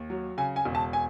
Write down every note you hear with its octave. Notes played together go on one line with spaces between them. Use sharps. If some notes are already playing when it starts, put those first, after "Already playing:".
Already playing: D#2
F#3
C#3 G#5
G#5
E1
A5
G#5